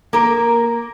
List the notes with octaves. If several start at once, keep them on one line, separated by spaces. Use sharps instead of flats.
A#3 A#4